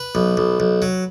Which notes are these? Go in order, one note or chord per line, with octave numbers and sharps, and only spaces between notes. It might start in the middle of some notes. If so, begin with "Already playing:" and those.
Already playing: B4
B1
B1
B1
F#3